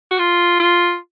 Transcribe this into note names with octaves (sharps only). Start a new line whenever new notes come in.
F#4
F4
F4